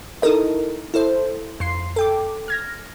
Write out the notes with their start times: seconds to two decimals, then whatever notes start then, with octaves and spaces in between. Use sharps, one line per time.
0.22 D#4 E4 A4 A#4 D#5
0.94 E4 A4 C5
1.60 F2 C6 C7
1.96 A4 G5 D6
2.48 F6 G#6 A#6